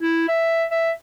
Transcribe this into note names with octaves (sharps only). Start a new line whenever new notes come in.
E4
E5
E5